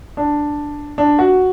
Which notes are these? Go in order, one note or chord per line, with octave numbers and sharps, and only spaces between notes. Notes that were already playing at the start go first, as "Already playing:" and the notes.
D4
D4
F#4